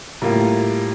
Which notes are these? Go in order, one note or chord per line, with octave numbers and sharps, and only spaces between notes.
A2 G3 A#3 F4